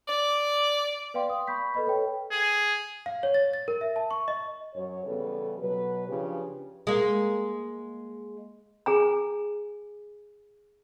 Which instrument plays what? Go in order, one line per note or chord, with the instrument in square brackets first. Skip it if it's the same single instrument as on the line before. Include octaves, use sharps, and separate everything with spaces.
[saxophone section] D5
[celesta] B4 D5 F5 G5 C6
D#6
B5 C#6 G6 B6
A4 B4 D#5 B5
A4 B4 C#5 G5
[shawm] G#4
[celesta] F5
C#5
A6
A6
A#4
E5
A5
C#6
D#5
[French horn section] F#2 C#5
C#3 E3 G3 B3 A4 B4
B2 F#3 B4
C#3 F3 C#4 D4 G4 B4
[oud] G#3 A#3
[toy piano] G#4 G#5 A#5